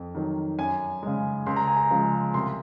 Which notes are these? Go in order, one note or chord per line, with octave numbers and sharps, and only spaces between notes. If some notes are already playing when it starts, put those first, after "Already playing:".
Already playing: F2
D#3 F#3
F#2 G#5
C#3 G#3
C#2 C6
A#5
G#5
A#5
C#3 F3 G#3
C2 C6